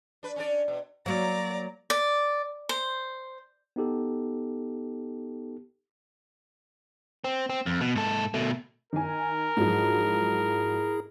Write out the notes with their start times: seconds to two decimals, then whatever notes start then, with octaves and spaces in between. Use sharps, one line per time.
0.23 D4 B4
0.36 C#4 D4 D5
0.68 B2
1.06 F#3 A#3 D5 A#5
1.90 D5
2.69 C5
3.76 B3 D#4 G4 A4
7.24 C4
7.50 C4
7.66 F2
7.81 B2
7.96 G#2 A4
8.34 B2 A3
8.93 D#3 A#4 G#5
9.57 G#2 F3 F#3 E4 G#4